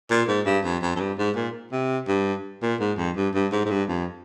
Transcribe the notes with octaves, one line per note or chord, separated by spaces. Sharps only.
A#2
G#2
G2
F2
F2
F2
G2
G#2
A#2
C3
G2
A#2
G#2
F2
G2
G2
G#2
G#2
G2
F2